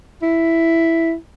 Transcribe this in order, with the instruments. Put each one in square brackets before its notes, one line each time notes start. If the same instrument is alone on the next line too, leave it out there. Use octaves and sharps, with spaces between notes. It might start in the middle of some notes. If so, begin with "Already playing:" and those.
[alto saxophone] E4